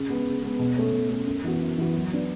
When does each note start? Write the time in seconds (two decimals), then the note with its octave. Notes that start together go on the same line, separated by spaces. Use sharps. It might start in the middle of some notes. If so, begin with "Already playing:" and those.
Already playing: C#3
0.09 G#3 B3
0.26 C#3
0.43 G#3 B3
0.59 B2
0.76 A3 C#4
0.93 B2
1.09 A3 C#4
1.26 F#2
1.44 E3 B3 F#4
1.60 F#2
1.78 E3 B3 F#4
1.94 F#3
2.11 B3 D4